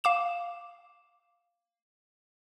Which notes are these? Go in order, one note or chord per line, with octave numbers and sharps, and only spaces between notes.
F5 D6 E7